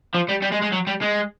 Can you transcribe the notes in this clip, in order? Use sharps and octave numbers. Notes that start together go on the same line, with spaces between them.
F3
G3
G3
G#3
G#3
F#3
G3
G#3